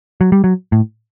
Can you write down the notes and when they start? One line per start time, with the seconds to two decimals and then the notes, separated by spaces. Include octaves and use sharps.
0.21 F#3
0.32 G3
0.44 F#3
0.72 A2